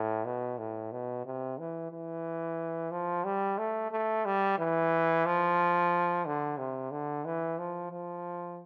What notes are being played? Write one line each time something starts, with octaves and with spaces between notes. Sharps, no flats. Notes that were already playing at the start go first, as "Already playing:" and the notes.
Already playing: A2
B2
A2
B2
C3
E3
E3
F3
G3
A3
A3
G3
E3
F3
D3
C3
D3
E3
F3
F3